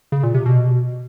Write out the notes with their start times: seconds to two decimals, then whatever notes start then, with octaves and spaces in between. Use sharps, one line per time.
0.12 C#3
0.23 A#2
0.34 C3
0.46 B2